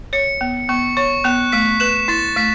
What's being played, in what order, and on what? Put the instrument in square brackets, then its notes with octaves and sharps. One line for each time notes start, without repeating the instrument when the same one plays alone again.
[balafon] C#5 [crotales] C#7
[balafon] B3
[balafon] B3 [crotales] C#6
[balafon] C#5 [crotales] C#6
[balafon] B3 [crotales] F#6
[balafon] A3 [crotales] B6
[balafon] B4 [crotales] E7
[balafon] E4 [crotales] A6
[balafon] A3 [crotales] B6